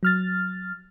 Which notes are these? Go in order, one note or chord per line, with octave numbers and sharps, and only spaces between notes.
F#3 F6 A6